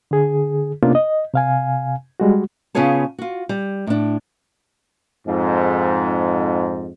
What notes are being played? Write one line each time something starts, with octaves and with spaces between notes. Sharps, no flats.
D3 G#4
C3 A#3 B3 C#4 D4 F4
D#5
C3 F5 G#5
G3 G#3 F#4
C#3 B3 F4 G#4 C#5 A5
F4 F#4
G3
A2 D4
F2 G#2